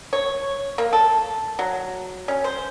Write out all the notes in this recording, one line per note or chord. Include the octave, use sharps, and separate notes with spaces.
C#5
A#3
A4
F#3
C#4
C5